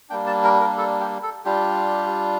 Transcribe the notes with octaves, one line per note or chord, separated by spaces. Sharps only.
G3 A#3 D4 G5
A5
A#4
A#4
A4
G4
A4
G3 D4 F4 G4